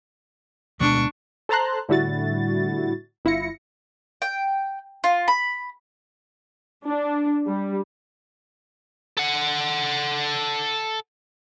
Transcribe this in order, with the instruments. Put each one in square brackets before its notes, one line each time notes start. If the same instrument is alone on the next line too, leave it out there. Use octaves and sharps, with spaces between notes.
[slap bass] D2 B2 G#3 [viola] D4 C#6
[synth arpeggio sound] A4 C5 A5 A#5 C6 F#6
A2 D3 G3 E4 F#4 A6
G1 E4 F4 A#6 C#7
[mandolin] G5
F4
B5
[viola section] D4
G3
[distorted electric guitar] A4 F#5